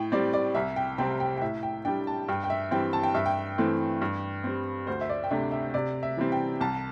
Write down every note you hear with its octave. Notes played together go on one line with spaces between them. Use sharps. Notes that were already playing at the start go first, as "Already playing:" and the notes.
Already playing: A2 G5
G3 C4 D5
D5
C2 E5
G5
C3 G3 C4 G5
G5
G5
A2 E5
G5
G3 D4 G5
A5
G2 G5
G5
E5
E3 G3 C4 G5
A5
G5
G2 E5
G5
E3 A3 C4
G2
G3 C4
D2 C5
E5
D5
G5
C3 A3 D4 E5
E5
C3 D5
E5
E3 G3 C4
G5
C2 A5